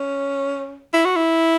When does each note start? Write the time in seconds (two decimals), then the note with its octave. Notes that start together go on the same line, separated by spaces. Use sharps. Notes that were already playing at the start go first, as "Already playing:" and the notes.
Already playing: C#4
0.93 E4
1.05 F#4
1.16 E4